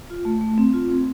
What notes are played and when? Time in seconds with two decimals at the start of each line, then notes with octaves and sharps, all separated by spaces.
0.10 F4
0.25 A3
0.41 A3
0.58 C4
0.74 F4
0.90 C4